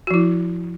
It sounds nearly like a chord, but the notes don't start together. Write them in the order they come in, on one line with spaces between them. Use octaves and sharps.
F#4 F3 E4